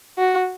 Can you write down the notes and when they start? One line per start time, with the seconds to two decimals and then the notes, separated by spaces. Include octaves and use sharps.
0.18 F#4